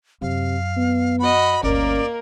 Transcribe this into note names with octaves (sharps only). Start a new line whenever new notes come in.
F#2 C3 F5
B3
F#4 D#5 B5
G1 D2 A#3 C#4 A#4 D5